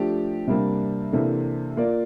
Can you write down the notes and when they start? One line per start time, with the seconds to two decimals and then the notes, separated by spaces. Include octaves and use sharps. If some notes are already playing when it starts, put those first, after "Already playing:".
Already playing: F3 A3 D4 G4
0.47 C3 G3 A#3 D4
1.13 C3 E3 A#3 D4 A4
1.77 A#3 F4 A#4 D5